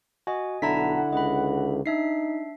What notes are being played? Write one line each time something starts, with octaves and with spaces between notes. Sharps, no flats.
F#4 D#5 G#5
B1 D3 E4 F#5 A5 A#5 B6
C#2 D#5 B5
D4 D#4 E5 C7